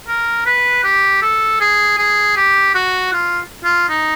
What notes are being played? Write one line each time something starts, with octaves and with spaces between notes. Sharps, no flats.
A#4
B4
G4
A4
G#4
G#4
G4
F#4
F4
F4
D#4